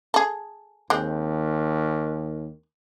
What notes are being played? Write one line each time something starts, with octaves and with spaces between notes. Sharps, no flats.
G#4 A4
D#2 G#3 C4